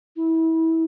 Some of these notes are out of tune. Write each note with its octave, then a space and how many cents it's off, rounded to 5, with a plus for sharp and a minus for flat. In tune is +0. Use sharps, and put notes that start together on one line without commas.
E4 -25